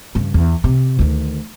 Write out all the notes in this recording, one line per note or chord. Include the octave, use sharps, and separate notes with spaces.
G2 C#3
E2
C3
D2 D#3